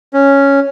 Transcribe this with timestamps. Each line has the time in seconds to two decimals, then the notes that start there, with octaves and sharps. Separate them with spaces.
0.13 C#4